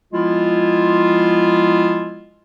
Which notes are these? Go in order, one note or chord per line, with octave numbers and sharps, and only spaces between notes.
F3 G#3 B3 E4 F4